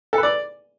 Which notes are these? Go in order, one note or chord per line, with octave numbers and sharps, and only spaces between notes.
A4
B4
D5